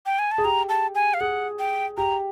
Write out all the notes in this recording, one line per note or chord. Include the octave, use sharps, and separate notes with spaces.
G5
G#5
A5
G#4
G4 A#5
A5
G#5
F5
G#4 F#5
G5
G4 A#5